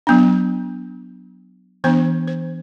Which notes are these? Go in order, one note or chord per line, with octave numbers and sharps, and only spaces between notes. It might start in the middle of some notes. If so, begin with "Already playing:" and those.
F#3 B3 D4
E3 B3 D4 C5
C5